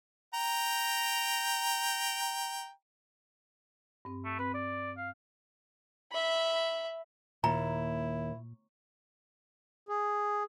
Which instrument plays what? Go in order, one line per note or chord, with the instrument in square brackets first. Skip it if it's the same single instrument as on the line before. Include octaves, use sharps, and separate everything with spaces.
[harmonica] G5 A#5
[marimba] G2 C4
[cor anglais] A3
[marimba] C4 [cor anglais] B4
[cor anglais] D5
F5
[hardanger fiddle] E5 B5
[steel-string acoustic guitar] D#2 [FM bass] A#2 [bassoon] E4 [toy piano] A#5
[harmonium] G#4